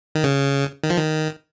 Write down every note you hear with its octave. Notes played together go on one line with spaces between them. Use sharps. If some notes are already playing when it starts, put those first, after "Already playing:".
D#3
C#3
D#3
F3
D#3